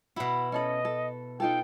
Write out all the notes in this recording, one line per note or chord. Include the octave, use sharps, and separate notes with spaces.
B2 E4 F#4 F#5
C#4 A4 D#5 B5
A4
D#4 F4 A4 G5